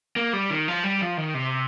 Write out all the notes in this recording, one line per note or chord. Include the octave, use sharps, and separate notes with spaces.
A#3
G3
D#3
F3
G3
F3
D#3
C3